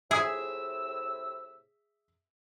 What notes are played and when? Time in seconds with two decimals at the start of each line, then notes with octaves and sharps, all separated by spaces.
0.11 A2 C3 G#4 E5 D#6 E6